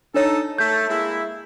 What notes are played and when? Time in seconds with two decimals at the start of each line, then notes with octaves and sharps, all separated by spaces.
0.14 D4 D#4 A4 C#5
0.58 A3 G6
0.89 G#3 A#3 E4